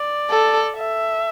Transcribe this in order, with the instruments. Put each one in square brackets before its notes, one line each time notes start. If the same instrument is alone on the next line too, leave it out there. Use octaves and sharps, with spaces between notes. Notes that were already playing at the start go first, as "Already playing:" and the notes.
Already playing: [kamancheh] D5
[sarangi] A4
[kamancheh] E5